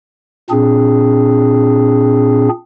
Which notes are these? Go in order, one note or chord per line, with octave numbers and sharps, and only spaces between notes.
A#2 C4 D4 G#4